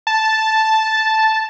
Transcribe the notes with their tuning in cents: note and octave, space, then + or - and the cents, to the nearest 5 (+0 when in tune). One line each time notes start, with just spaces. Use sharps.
A5 -5